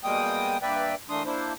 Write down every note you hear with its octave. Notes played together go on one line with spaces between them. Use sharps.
B2 G3 G#3 A#3 G5 D#6
G2 A#3 B4 D5 E5 G5
E3 A3 A#3 D4 C6 D#6
A#3 D4 E4 C5